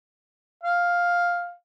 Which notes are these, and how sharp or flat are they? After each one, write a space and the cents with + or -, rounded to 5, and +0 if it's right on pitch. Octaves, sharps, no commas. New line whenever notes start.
F5 +5